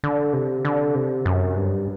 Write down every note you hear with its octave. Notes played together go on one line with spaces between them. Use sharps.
D3
C3
D3
C3
F#2
G2